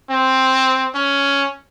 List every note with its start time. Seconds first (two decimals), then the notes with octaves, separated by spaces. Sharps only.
0.10 C4
0.95 C#4